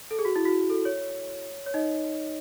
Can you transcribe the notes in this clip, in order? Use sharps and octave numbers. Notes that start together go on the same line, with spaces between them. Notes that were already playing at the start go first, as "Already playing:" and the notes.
A4
G#4
F#4
E4
F#4
A4
C#5
C#5
D#4 D#5